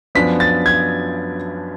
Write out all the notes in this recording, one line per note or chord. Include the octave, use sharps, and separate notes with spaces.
F#2 F3 B3 D4 B6
A6
G#6